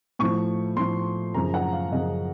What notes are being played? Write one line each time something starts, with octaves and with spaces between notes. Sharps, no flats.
A2 F3 C#6
A2 F3 C6
F#2 C#3 F3 A#5
F#5
F5
F#2 C#3 F3 D#5